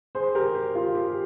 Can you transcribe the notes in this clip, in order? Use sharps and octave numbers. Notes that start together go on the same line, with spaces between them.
G#4 C5
G4 A#4
G4
F4
G4